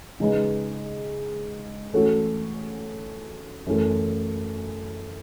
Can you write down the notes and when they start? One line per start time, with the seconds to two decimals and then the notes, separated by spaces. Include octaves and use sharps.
0.20 C#3 G#3 D#4 G#4 B4
1.93 E3 A3 C#4 F#4 A4
3.66 F#2 E3 A3